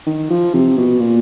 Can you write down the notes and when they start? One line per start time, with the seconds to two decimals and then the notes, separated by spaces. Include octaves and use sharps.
0.06 D#3
0.30 F3
0.54 C3
0.77 B2
1.00 A#2